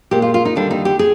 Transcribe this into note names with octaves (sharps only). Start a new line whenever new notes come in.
A#2 G#3 G4
F4
F4
D#4
D#2 D3 G3 D4
D#4
G4
G#4